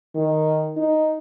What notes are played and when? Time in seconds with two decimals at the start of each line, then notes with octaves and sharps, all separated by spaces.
0.15 D#3
0.77 D#4